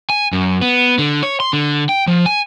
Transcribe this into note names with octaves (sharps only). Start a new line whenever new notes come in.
G#5
F#2
B3
D3
C#5
C6
D3
G5
F3
G#5